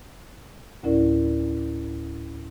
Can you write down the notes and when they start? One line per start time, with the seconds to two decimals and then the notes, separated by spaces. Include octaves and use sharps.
0.83 D2 A2 C#4 E4 A#4 D5